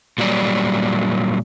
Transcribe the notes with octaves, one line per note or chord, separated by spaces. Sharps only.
A#2 F#3 G3 D5